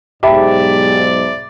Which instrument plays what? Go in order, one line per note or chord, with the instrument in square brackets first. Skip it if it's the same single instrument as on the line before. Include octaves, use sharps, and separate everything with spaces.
[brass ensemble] B1 G#2 [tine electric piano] G4 [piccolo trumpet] D5 [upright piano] E5 A5 B5